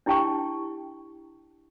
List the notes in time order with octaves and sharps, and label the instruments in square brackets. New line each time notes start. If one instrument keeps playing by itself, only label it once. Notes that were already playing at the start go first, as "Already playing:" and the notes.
[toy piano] D4 E4 G4 G5 A5 C#6